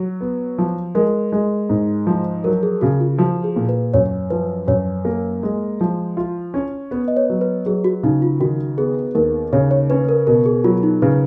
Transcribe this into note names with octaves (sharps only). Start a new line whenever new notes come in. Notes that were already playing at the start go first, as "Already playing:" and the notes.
Already playing: F#3
B3
F3
G#3 A#4
G#3
G#2
F3
F#3 A#4
G#4
C#3 F#4
F4
F3 F#4
G#4
A#2
B4
F#2 C#5
F3 B4
F#2 C#5
A#3
G#3
F3
F4
C#4
B3 B4
D#5
C#5
F#3
B4
F#3 G#4
F#4
C#3 D#4
F4
D#3 F#4
B3 G#4
D#2 A#4
C#3 C#5
C#5
C#4 B4
A#4
B2 A#4
G#4
F#3 F4
D#4
C#3 B4